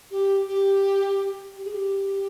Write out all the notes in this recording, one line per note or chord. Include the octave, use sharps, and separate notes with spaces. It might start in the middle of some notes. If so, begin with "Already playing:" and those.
G4
G4
G4
G#4
G4